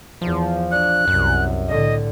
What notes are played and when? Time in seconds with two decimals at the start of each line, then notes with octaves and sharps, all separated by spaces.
0.21 E2 F3
0.72 D4 F#6
1.08 C2 F#2
1.68 A2 D3 D#5